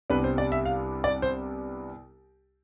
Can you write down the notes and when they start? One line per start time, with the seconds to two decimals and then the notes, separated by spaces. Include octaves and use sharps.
0.10 C2 C3 G3 B3 D4 B4
0.24 C5
0.38 D5
0.52 E5
0.65 F5
1.04 D5
1.22 C5